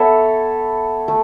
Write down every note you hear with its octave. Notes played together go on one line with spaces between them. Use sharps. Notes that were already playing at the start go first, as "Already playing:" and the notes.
Already playing: B3 A4 C#5 E5
A3